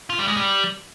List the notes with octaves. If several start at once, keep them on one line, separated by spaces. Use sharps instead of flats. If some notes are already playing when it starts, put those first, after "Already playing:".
F4
G3
G#3
G3